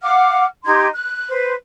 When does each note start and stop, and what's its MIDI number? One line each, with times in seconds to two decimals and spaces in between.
0.02 0.44 77
0.02 0.44 78
0.02 0.44 86
0.02 0.44 89
0.65 0.86 63
0.65 0.86 67
0.65 0.86 84
0.65 0.86 92
0.93 1.28 90
1.30 1.53 71
1.30 1.53 72